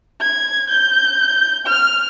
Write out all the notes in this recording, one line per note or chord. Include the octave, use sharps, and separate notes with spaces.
G#6
G6
F6